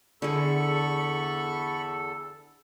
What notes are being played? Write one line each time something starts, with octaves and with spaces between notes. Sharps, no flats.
E2 D3 G#4 A4 B5 C#6